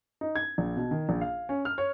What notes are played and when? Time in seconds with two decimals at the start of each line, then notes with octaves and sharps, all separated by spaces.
0.21 D#4
0.36 G#6
0.58 A#1
0.77 B2
0.91 D#3
1.09 A#1
1.21 F5
1.49 C#4
1.65 F6
1.78 C#5